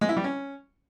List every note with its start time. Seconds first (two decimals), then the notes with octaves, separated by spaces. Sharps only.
0.01 G#3
0.09 E4
0.16 G3
0.24 C#4